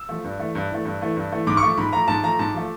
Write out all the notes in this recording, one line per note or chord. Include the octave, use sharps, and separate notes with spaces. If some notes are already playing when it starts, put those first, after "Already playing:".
Already playing: E6
F3 A3
G2
E3 A3
G2
E3 A3
G2
E3 A3
G2
E3 A3
G#2 D6
C#6
F3 A3
G#2 B5
F3 A3 A#5
G#2 A5
F3 A3 A#5
G#2 A5
F3 A3